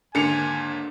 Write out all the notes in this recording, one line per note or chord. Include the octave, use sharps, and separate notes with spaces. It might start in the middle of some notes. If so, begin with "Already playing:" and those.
D#2 G#2 D3 A#3 G#5 C#7 F7